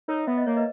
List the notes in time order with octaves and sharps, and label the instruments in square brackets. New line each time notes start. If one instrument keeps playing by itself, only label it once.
[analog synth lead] D#4 [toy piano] A#4 C#5
[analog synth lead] B3 [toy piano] E5
[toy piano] D#5
[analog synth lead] A#3 [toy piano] C#5
[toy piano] B4 D#5